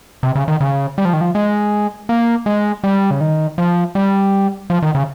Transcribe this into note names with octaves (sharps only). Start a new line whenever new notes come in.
C3
C#3
D#3
C#3
G3
F3
D#3
F3
G#3
A#3
G#3
G3
C#3
D#3
F3
G3
F3
D#3
C#3